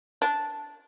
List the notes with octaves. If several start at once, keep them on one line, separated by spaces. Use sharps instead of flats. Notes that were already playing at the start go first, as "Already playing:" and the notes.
D4